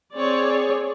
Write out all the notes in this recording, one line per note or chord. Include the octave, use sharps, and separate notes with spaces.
C4 G#4 C#5 D5